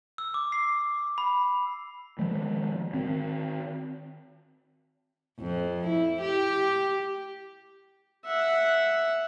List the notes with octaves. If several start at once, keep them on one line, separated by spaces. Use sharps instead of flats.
E6
D6
C7
B5
D#3 F3 G#3
D#3 C4
F2
E4
G4
E5 F#5